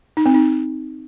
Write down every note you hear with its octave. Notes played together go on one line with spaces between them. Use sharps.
D#4
C4
D#4